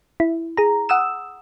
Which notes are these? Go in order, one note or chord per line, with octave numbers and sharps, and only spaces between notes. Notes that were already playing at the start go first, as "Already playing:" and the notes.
E4
G#4 A#5
F#5 D#6 E6 E7